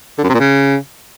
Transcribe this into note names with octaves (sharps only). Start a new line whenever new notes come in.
D3
F#2
C3
A#2
C#3